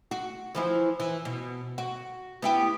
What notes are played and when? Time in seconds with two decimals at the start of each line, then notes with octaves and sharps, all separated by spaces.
0.11 F#4
0.55 E3 F3 E4
1.00 E3
1.25 B2
1.78 F#4
2.42 B3 E4 G4